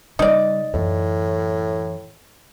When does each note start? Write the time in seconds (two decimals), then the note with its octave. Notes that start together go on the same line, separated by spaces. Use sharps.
0.19 C#3 G3 D#4 D5
0.74 F#2 A2 E3